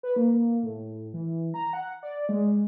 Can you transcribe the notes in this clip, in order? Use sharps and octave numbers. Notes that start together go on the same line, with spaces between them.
B4
A#3
A2
E3
A#5
F#5
D5
G#3